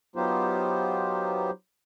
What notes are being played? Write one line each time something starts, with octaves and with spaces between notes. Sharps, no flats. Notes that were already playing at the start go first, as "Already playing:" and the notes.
F#3 B3 D#4 F4 G4 C5